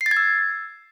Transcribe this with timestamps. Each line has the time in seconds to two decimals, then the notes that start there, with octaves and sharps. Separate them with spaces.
0.01 C7
0.06 A6
0.11 G#6
0.17 E6